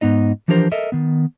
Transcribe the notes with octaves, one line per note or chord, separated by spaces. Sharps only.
G#2 B3 D#4 D#5
E3 F3 D4 G4 A#4 C5
A4 A#4 D#5 E5
D#3 B3